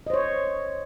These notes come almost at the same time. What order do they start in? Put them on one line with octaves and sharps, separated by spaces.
D#5 C5 C#5